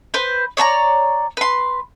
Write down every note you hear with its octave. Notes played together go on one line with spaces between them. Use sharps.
B4 C5
C#5 D5 A5 A#5
B4 C6